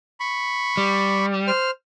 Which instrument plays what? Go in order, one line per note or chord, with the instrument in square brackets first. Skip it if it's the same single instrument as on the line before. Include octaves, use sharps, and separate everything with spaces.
[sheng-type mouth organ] B5 C#6
[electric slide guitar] G3
[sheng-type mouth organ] C5 F6